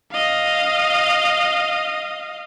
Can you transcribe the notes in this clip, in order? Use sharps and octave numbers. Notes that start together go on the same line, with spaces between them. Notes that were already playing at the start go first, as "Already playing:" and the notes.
D#5 F5